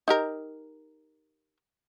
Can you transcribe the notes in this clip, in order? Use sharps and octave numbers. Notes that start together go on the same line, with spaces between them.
D#4 G4 A#4